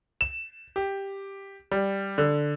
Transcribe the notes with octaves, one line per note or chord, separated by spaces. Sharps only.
E7
G4
G3
D3